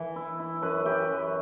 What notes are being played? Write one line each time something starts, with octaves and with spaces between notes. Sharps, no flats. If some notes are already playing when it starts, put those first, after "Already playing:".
Already playing: E3
E4
E4
F#2 B4
E3 G4
F#2